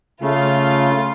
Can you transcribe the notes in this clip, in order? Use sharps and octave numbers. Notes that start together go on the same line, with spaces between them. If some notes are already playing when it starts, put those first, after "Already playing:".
C#3 A3 F4